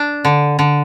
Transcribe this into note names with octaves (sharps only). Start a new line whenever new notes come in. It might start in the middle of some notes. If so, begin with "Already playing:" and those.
Already playing: D4
D3
D3